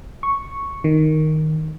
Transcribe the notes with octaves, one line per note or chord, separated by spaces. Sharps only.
C#6
D#3